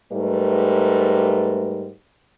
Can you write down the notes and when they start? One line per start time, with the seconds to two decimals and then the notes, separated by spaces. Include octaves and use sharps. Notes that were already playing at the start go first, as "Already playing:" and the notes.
0.12 G#2 G3 A3 A#4 B4